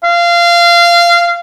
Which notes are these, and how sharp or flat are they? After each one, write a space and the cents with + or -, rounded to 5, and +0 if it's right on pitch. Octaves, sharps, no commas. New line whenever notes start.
F5 -20